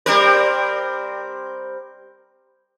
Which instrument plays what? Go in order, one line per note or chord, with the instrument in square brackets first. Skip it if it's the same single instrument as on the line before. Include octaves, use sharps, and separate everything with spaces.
[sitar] G3 C4 A#4